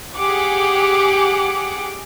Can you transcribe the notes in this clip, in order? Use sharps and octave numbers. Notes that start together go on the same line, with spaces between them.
G4 G#4 F#5 D6